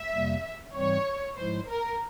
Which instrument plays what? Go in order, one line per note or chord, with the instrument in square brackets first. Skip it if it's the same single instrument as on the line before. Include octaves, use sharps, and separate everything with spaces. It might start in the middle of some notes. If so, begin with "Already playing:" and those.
Already playing: [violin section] E5
[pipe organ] F2 C3 G3 A#3
[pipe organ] G#2 E3 G3 C4 [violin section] C#5
[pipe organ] G#2 F3 G#3 E4 [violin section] C5
[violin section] A#4